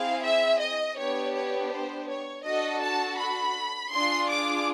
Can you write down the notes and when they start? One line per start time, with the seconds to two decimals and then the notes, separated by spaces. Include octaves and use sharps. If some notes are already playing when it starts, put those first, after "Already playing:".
Already playing: C4 E4 G#4 F5
0.24 E5
0.60 D#5
0.97 B3 D4 G4 C#5
1.34 C#5
1.72 C5
2.08 C#5
2.44 D4 F#4 A4 D#5
2.82 A5
3.18 B5
3.92 D4 F4 G#4 C6
4.29 D6